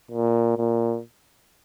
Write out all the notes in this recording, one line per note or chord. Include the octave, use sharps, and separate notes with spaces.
A#2
A#2